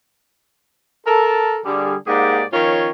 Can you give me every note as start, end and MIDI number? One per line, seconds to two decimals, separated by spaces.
1.06 1.60 69
1.06 1.60 70
1.06 1.60 81
1.65 1.95 50
1.65 1.95 55
1.65 1.95 68
2.07 2.43 44
2.07 2.43 58
2.07 2.43 67
2.07 2.43 68
2.07 2.43 74
2.07 2.43 78
2.53 2.90 51
2.53 2.90 53
2.53 2.90 61
2.53 2.90 65
2.53 2.90 73